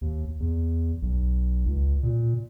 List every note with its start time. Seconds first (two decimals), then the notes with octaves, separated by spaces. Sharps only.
0.01 D#2
0.40 E2
1.02 B1
1.66 C#2
2.03 A#2